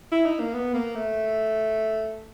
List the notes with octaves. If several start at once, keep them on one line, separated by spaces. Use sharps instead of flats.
E4
D#4
A#3
B3
A#3
A3